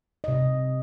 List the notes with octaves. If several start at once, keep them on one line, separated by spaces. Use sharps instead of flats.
C3 D#5